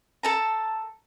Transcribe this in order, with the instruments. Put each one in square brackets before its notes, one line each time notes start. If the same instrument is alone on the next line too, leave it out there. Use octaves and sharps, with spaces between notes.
[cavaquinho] A4 A5 A#5